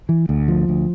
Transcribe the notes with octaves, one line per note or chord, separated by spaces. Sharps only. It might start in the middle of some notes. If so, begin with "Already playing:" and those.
E3
D2
F3
D2